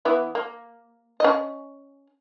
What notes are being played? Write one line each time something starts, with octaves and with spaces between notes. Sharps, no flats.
E3 B3 E4
A#3
C#4 D#5